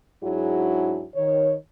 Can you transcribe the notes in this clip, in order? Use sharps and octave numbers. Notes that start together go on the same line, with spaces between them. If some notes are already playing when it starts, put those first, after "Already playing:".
G#2 F#3 D4 E4 F#4 G#4
D#3 C#5